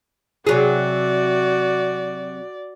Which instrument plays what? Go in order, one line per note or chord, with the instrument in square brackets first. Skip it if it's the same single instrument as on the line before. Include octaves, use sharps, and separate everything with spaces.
[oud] C3 F#3 G#4 [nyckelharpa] F#4 [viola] D5